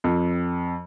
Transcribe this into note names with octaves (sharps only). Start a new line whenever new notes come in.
F2